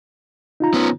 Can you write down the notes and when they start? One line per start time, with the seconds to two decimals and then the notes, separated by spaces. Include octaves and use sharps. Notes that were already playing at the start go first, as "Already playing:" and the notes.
0.60 D#4 F4 A#5
0.74 B3 C#4